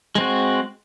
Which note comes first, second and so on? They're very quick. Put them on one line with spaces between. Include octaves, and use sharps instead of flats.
G#3 C4 F#4